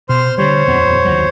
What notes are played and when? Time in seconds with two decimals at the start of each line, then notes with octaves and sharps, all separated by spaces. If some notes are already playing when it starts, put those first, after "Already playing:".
0.09 B2 C5 C6 F6
0.38 D3 G3 C5 C#5
0.67 D#1 F2 B3
1.05 F#1 D#2 F#3